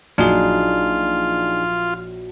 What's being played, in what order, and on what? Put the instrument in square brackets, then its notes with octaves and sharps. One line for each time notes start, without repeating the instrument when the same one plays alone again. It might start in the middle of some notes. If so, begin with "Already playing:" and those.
[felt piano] A#1 F#3 [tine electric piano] D4 D#4 G#4 [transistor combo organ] F4